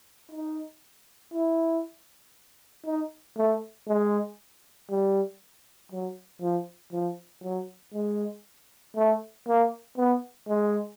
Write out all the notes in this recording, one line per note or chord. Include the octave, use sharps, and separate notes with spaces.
D#4
E4
D#4
A3
G#3
G3
F#3
F3
F3
F#3
G#3
A3
A#3
B3
G#3